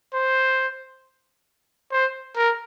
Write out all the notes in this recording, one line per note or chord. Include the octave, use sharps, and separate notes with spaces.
C5
C5
A#4